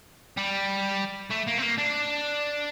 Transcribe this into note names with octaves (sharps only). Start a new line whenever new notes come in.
G3
A3
A#3
C4
A#3
D4